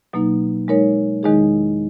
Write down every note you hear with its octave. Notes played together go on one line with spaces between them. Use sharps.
B2 F#3 A#3 D#4
G#3 D#4 A#4 C#5
E2 D#3 G#3 D#4 G#4